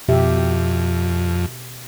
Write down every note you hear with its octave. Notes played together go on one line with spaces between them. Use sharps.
F2 B2 G4 E5